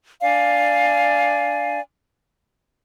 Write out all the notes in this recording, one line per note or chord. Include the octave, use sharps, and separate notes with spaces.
D4 D5 F5 G#5